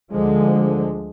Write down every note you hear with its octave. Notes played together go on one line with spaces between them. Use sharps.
D2 D3 F3 G#3